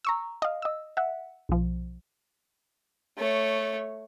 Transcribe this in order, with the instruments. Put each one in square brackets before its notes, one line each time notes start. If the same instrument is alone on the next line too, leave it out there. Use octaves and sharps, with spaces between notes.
[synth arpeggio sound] A#5 C#6 E6
D#5 F5
D#5 E6
E5 F#5
B1 F3
[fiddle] A3 C#5